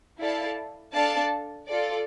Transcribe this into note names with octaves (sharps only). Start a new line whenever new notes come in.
E4 A4 D5 F5 A5
D4 A4 D5 F5 A5
F4 A4 D5